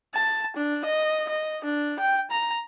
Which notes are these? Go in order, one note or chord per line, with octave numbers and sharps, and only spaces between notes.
A5
D4
D#5
D#5
D4
G5
A#5